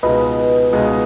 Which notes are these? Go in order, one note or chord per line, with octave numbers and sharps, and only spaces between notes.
C#2 B2 G#3 D#4 B4 D#5
C#2 B2 G#3 D#4